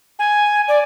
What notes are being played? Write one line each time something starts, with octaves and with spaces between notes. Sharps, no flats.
G#5
D5